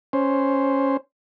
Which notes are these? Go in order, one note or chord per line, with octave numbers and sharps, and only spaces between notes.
C#4 C5